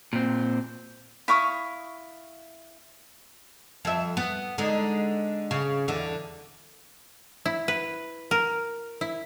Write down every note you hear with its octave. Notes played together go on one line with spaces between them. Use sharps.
A#2 C4
E4 F5 C#6 D#6
F2 E5
B3
D3 G#3 D#4
C#3
E2 D3
E4
B4
A#4
E4